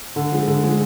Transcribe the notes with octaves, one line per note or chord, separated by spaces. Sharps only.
D3
F3 G#3
D3
F3 G#3